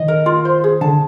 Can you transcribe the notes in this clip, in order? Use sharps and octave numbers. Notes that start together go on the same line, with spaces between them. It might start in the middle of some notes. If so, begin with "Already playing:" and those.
Already playing: D#3 D#5
A#4
F4
C5
G#4
D3 A5